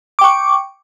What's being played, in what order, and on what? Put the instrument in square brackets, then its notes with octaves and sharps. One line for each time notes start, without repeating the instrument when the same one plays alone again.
[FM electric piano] D6
G5
C#6